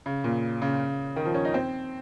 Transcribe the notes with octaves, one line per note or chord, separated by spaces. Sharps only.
C#3
A#2
C#3
D#3
F3
C#4
D#4
C4